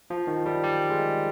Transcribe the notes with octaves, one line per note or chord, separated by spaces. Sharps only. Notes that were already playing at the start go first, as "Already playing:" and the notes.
F3
D#3
G3
G3
G#3